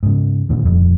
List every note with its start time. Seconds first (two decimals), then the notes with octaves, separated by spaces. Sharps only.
0.03 G#2 C#3
0.49 D#2 A#2 D3
0.65 D#1 F2